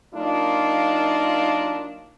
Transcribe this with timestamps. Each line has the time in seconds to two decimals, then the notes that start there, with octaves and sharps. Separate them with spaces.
0.14 F#3 A#3 D4 D#4 F4